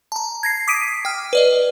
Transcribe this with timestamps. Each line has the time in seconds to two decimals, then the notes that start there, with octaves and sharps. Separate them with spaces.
0.12 A5 A#5
0.43 G#6 A#6 C7
0.68 D6 D#6 B6 C7 D7 D#7
1.05 G5 F6
1.33 B4 D5 D#5